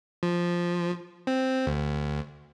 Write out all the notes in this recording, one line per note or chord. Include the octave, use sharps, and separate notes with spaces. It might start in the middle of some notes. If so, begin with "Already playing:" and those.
F3
C4
D2